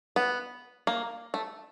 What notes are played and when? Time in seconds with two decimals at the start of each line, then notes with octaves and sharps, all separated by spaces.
0.16 B3
0.87 A#3
1.34 A3